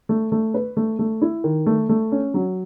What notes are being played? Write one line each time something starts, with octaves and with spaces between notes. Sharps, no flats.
A3
A3
B4
A3
A3
E4
D#3
A3
A3
C#4
F#3